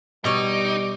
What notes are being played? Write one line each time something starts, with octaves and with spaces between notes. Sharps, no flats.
B2 G3 D#4 C#5 D6